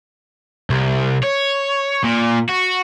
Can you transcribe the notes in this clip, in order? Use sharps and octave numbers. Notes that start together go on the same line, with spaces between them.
C2
C#5
A#2
F#4